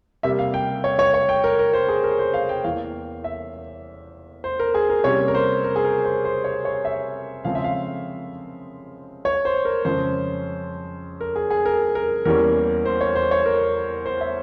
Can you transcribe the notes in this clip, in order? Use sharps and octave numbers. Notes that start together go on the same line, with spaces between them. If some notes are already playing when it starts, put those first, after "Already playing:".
C3 G3 A#3 E5
F5
G5
C#5
C#5
C#5
G5
A#4
A#4
C5
G#4
A#4
C5
F5
G5
E2 E3 A#3 F5
E5
C5
A#4
G#4
A#4
C3 G3 A#3 C#4 C#5
A#4
C5
A#4
G#4
A#4
C5
C5
C#5
C#5
E5
C#3 F3 G#3 C4 F5
E5
F5
C#5
C5
A#4
F2 C#3 F3 G#3 C#4 C5
A#4
G#4
G#4
A#4
A#4
E2 E3 G3 A#3 C#4 A#4
C5
C#5
C5
C#5
A#4
C5
E5